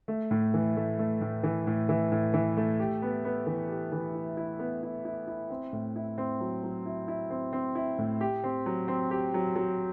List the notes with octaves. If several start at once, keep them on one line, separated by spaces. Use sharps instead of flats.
A3
A2
E3
A3
A3
A2
E3
A2
E3
A2
E3
A3
G4
B3
B3
E3
G4
E3
E4
E4
B3
E4
E4
E4
C4
A2
E4
C4
F#3
F#3
E4
E4
C4
C4
E4
A2
G4
C4
F#3
C4
G4
F#3
F#3